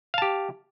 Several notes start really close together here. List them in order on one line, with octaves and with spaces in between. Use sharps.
F5 A5 G4